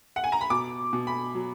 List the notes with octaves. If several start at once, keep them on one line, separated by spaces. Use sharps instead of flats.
F#5
G#5
A#5
B5
B2 D6
B2
B5
F#3